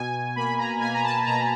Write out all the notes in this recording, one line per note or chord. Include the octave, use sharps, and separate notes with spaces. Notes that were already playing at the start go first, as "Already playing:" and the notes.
Already playing: B2 G#5
A#3 B5
A#5
A#3 G#5
A#5
A5
B2 A#5